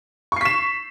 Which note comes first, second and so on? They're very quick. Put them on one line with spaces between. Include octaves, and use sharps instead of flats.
C#6 C7 B6 E7